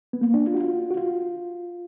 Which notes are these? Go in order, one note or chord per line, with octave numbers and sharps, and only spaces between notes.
B3
A#3
D4
F4
F#4
F4
F#4
F4